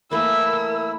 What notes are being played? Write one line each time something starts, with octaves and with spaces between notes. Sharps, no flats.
E3 A3 A#3 E4 A#4 E6